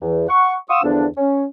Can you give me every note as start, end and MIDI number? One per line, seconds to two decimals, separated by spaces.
0.01 0.28 40
0.01 0.28 52
0.29 0.54 78
0.29 0.54 85
0.70 0.81 77
0.70 0.81 78
0.70 0.81 84
0.70 0.81 85
0.70 0.81 87
0.70 0.81 88
0.84 1.06 40
0.84 1.06 50
0.84 1.06 53
0.84 1.06 59
0.84 1.06 62
1.17 1.44 61